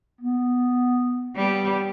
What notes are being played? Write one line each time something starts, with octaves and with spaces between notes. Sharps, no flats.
B3
G3 B3